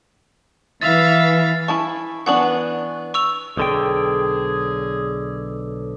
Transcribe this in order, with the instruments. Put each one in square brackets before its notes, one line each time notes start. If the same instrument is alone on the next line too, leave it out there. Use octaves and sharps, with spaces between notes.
[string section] E3 [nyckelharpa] E5 F5 [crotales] A6
[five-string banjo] E4 G#5 A5 [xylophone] C#6
[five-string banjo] E3 B3 D4 [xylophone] F#5 C#6 F#7
[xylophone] C#6 E6 F7
[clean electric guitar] B1 D3 G5 [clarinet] G#4